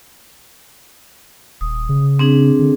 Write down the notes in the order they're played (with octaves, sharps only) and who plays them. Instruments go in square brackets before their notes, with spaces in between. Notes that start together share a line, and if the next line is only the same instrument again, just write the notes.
[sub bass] D#1 [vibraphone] D#6
[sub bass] C#3
[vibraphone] C4 D4 G#4
[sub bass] D3